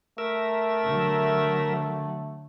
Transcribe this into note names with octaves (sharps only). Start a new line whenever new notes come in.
A3 A#4 E5
D3 F#3